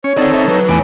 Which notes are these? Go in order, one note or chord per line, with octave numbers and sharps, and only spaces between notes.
C#4 C#5 C#6
C4 D#4 A4 D5 F#5
A#4 E5
F#3 B4
E2 A2 E3 G#5 D6